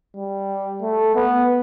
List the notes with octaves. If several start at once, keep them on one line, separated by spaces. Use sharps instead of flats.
G3
A3
B3